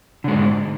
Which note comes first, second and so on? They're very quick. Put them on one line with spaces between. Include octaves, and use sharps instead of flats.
D3 G#3 G#2